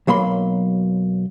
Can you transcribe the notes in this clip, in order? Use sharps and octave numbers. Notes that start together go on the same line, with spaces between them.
B1 F#3 A#3 B5 C6